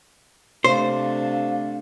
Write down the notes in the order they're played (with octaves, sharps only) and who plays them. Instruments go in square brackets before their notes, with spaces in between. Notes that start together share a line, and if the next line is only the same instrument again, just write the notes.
[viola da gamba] C3 A3 D4 [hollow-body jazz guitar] C5 [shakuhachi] F5